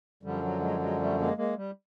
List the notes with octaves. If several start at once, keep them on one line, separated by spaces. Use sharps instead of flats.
F#2 D3 F3 G3
F#3
F#3 G#3
F#3 G#3
G3 A3
G#3 A#3
G#3 A#3
G3